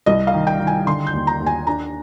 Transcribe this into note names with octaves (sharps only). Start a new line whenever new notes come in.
C2 D#5
F5
D#3
G5
D#3
G#5
D3 C6
G6
D#2
A#5
D#2
G#5
D4 A#5